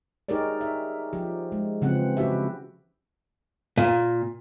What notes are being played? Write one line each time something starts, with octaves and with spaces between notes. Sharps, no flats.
D#4 G4 G#4 A#4 C#5 D5
E5
F3 G4
G#3
C#3 E3 F3 C4 C#4 F#5
E4 F#4 G4 E5
A#2